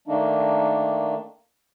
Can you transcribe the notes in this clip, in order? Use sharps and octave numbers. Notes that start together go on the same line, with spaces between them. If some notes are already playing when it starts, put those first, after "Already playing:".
D#3 A3 A#3 D4 D#4